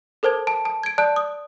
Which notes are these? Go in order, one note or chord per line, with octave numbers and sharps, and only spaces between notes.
A4 A#4 C5 A5 G#6
A5
A5
G#6 D7
D5 A5 F#6
D#6